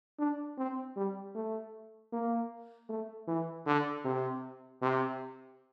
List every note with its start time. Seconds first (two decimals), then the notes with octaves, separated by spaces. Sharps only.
0.19 D4
0.57 C4
0.97 G3
1.35 A3
2.12 A#3
2.89 A3
3.27 E3
3.66 D3
4.04 C3
4.82 C3